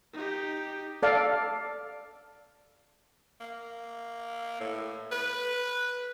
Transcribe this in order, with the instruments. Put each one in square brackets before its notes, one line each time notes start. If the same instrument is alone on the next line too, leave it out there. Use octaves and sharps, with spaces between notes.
[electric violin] D#4 G4
[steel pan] A4 D5 F5
[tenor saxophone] A#3
A2
B4